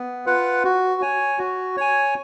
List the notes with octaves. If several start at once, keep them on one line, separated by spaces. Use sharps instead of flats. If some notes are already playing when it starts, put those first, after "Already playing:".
Already playing: B3
F4 B4 F#5
F#4
C#5 G#5
F#4
C#5 G#5